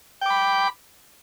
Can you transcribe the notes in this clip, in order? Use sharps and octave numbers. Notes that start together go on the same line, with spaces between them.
G5 B5 D6